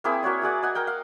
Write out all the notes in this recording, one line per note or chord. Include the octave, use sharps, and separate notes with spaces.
A#3 C4 E4 G#4
A#3 F#4 C#5 D5
F#4 G#4 D5 F#5
D#5 F#5 G#5
A#4 F#5 G5
F5